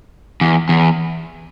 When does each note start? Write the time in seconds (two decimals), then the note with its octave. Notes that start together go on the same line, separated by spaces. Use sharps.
0.41 E2
0.69 E2